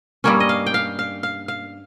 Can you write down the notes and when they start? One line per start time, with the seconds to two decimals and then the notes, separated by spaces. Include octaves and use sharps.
0.24 G2 G3 A#3 C#4 C#5
0.40 D#5
0.49 F5
0.66 G5
0.74 F5
0.99 F5
1.23 F5
1.48 F5